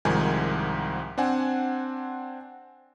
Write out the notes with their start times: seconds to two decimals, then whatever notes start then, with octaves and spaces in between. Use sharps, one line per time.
0.05 C2 G#2 D#3 F3 G#5
1.18 C4 D4 F#5 G#5